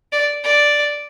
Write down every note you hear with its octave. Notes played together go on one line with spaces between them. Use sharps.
D5
D5